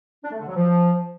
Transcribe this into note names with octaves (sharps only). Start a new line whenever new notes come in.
D4
A3
D3
F#3
F3